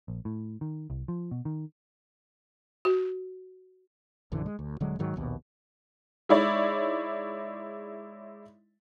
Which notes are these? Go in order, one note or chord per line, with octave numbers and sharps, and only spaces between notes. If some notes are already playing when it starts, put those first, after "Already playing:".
A#1
A2
D#3
C2
F3
B2
D#3
F#4
A#1 F#2 D3 E3
G#3
D2
D#1 D3 F#3 G#3
G#2 D#3 F#3
A#1 D#2 B2
G#3 D#4 E4 C#5 D5